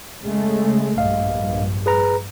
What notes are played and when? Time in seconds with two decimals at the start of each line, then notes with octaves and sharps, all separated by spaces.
0.23 C#3 G#3 A3
0.98 A#1 G2 D#5 F5
1.86 G#4 B4 A#5